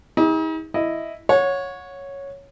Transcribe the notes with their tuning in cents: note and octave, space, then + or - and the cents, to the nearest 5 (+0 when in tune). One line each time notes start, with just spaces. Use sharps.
D#4 +45 G#4 -45
E4 +0 D#5 +0
C#5 +0 F#5 -30